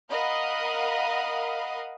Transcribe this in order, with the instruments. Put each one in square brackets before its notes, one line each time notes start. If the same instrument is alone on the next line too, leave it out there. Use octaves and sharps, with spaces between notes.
[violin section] A#4 D#5 F5 F#5 B5 D#6